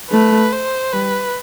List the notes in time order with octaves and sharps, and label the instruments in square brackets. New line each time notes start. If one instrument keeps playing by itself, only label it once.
[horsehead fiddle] A3 [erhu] B4
[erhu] C5
[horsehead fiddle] G3 [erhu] B4